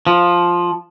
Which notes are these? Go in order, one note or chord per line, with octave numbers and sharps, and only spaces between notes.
F3